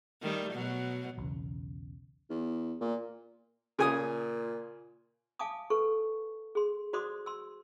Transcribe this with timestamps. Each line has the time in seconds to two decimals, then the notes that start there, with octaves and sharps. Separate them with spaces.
0.22 D#3 G3 A3
0.53 B2 F#3
1.18 B1 E2 C#3
2.30 E2
2.81 A#2
3.79 A#2 C#3 G#5 D#6
5.39 F5 G#5 A5 D6 D#6
5.70 A4 B4 C#6
6.55 G#4 C6
6.93 F#4 C5 D5 C6 D6 D#6
7.26 C6 E6